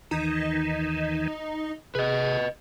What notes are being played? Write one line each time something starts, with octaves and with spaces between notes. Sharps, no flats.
D#2 D#3 E3 D#4
G#1 C3 G#4 B4 D#5